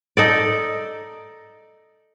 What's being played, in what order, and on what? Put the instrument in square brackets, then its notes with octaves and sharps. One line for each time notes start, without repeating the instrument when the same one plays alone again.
[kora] D#4 A4 D5